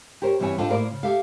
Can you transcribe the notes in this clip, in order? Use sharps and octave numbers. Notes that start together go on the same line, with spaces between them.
G4 A#4 C5 C#5
G2 E3 G3 C4 C#5 G#5
D4 D#4 F4 A4 C5 G5
A2 A#3 A#4 C5 D5
C#3
G4 A4 E5 F5